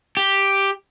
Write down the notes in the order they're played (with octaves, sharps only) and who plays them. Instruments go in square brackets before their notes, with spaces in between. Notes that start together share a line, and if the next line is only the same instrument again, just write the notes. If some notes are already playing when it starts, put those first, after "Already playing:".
[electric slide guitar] G4